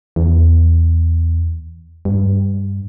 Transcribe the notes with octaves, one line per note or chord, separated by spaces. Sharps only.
E2
G2